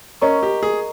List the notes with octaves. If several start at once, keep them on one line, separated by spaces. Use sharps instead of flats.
C#4 A#4 D#5 A#5 C#6
G4
G#4